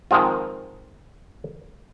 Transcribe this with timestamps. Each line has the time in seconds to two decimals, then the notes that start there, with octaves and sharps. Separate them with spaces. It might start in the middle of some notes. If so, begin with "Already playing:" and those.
0.11 D#3 F3 G#3 C4 F4